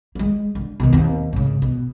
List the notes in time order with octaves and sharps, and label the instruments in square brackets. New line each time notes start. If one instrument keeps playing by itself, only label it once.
[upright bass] G#3 A#3
D3
B2 D#3
D#2 C4
G#2 C#3
B2